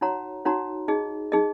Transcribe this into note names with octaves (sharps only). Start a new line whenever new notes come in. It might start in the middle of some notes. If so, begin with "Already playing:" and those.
D#4 F#4 C#5 F#5 A#5
D#4 F#4 C#5 F#5 A#5
D#4 G#4 D#5
D#4 G#4 D#5